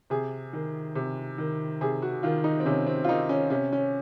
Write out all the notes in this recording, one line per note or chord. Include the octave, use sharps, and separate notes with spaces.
C3 G#4
D#3
C3
D#3
C3 G#4
F#4
D#3 F4
D#4
C4
C3 C#4
C4
F4
D#3 D#4
C#4
C3 C#4
C#4